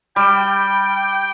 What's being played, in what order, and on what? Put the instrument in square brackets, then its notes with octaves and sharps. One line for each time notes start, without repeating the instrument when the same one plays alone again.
[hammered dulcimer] G3 [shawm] G5